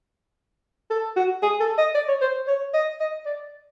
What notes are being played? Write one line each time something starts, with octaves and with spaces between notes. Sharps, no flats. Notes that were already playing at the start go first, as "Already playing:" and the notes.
A4
F#4
G#4
A4
D#5
D5
C#5
C5
C#5
D#5
D#5
D5